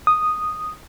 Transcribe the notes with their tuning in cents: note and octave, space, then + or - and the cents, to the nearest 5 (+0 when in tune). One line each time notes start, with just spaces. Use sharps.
D#6 -5